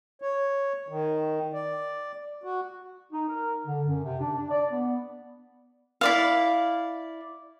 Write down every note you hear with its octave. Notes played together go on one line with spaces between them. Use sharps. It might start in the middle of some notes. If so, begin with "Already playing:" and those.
C#5
D#3
D5
F#4
D#4
A#4
D3
F#2
C3
D4
D4
D5
B3
E4 D5 F5